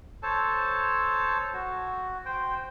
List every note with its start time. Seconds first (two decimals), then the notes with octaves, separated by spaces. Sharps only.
0.23 A4 C5 C#5 A5
1.53 F#4
2.26 C5 G5